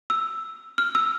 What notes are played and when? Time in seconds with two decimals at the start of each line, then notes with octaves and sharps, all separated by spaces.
0.10 E6
0.78 F6
0.95 E6